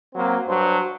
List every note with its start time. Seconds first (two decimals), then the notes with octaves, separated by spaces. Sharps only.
0.14 F#3 A#3 C4
0.47 G2 F#3 C5